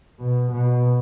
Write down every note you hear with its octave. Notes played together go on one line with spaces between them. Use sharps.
B2
B2